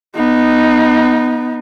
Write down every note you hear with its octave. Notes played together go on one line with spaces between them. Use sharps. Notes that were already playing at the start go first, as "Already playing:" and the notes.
B3 D#4